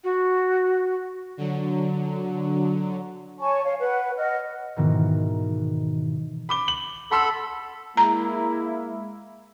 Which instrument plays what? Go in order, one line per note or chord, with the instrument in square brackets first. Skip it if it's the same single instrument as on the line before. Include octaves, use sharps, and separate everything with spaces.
[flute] F#4
[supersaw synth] D3 F#3
[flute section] C#5 G#5 A5 C#6
C#5 F5
B4 F#5
D#5 F#5 F6
[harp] G#2 B2 D#3 E3 B3
[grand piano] B5 D6 G7
F#7
[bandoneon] A4 B5 [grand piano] F#5 C6 E6
[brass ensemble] G#3 A#3 E4 [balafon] A#5